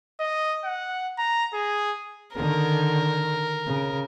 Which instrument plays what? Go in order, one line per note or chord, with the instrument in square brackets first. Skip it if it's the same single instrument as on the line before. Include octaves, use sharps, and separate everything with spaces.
[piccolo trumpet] D#5
F#5
A#5
G#4
[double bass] D3 D#3 [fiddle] A#4
[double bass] C#3